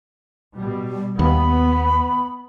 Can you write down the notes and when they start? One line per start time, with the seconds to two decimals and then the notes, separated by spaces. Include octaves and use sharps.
0.57 B2 G3
1.19 D#2 B3 B5